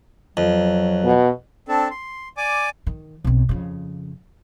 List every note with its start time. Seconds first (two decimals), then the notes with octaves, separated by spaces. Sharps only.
0.37 F2 F#3
1.04 B2
1.68 C4 D4 A4 A5
1.91 C6
2.37 D5 G#5 D6
2.87 D#3
3.24 B1 C4
3.49 F2 C#3